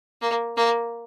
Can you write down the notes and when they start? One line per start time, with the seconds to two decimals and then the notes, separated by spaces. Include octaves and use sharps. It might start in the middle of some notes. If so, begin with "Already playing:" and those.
0.22 A#3
0.57 A#3